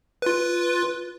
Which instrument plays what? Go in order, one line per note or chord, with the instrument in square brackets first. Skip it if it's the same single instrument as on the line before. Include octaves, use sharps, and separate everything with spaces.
[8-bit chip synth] F4 B4